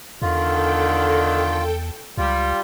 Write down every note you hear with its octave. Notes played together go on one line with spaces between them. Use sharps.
E2 D3 D#3 F4 A4 G5
C#2 G3 F4